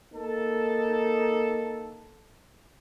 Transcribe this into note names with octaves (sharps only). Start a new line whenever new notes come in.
A#3 D#4 A4